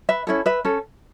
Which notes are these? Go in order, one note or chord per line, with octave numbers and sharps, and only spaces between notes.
B4 E5
C#4 E4 A4
B4 E5
C#4 A4